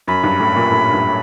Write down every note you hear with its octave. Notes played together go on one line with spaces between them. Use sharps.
F#2 B5
G2
A2
A#2
A2
G2